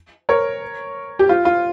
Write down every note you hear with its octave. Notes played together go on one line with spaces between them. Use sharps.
A#4 C#5
G4
F4
F4